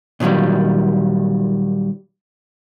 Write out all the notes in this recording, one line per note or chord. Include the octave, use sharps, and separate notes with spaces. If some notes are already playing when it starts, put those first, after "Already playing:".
A#2 D#3 E3 F#3 G3